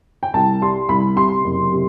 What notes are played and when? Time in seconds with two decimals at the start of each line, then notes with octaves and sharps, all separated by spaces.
0.23 G5
0.34 C2 A5
0.62 G3 C6
0.88 C2 B5
1.16 C3 C6
1.44 F#1
1.72 C3